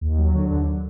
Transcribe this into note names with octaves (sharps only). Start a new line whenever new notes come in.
D#2
F#3
D3
D#2